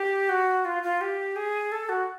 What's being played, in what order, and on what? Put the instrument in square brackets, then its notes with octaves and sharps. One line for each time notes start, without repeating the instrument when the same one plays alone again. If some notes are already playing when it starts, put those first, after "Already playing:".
Already playing: [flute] G4
F#4
F4
F4
G4
G#4
A4
F#4